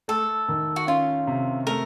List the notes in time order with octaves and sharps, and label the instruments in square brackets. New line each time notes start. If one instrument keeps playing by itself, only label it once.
[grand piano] A3 [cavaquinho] A4
[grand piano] D#3
[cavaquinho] F#4
[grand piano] C#4 [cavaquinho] F4
[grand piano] C3
[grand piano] A3 [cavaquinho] A#4